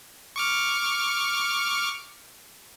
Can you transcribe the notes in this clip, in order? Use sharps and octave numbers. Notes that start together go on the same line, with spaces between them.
C#6 D6 F6